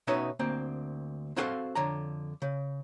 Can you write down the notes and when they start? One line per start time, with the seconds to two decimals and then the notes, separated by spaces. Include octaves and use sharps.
0.07 B2 B3 C#4 D#4 C#5 E5
0.39 D2 A#3 C4
1.36 C4 E4 F#4 A4 C5 F5
1.75 F2 D3 C#5 A#5
2.42 C#3